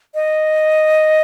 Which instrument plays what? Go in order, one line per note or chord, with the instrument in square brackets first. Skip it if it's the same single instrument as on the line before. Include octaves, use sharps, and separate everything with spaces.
[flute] D#5